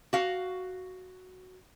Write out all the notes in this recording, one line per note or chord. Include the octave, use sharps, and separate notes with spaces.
F#4 F5